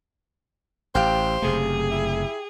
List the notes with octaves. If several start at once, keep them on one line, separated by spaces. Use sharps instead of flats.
A1 G4 C5 F5 G5
F#1 C3 A3 G#4
E4